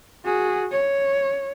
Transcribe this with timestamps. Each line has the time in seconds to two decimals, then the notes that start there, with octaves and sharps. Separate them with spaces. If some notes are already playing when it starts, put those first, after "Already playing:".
0.25 F#4 G#4
0.72 C#5